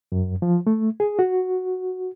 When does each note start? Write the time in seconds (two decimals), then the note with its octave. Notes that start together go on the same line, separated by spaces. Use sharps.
0.12 F#2
0.42 F3
0.67 A3
1.00 G#4
1.19 F#4